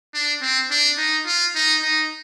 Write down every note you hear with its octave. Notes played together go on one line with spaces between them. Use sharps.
D4
C4
D4
D#4
F4
D#4
D#4